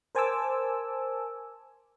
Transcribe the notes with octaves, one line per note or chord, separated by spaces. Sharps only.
A#4 C5 G#5 A5 D6 E6